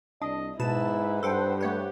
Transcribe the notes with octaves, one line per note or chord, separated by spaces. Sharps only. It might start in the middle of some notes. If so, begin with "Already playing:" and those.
C2 D4 D#5
G#2 B2 E4 B4 A5 E7
G2 A4 C5 F#5 G5
A3 G4 C#5 F#5